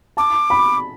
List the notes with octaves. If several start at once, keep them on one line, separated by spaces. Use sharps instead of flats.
A5 D6
B5